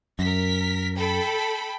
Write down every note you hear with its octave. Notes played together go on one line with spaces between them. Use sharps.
F#2 A#4 B6
A4 G5 B5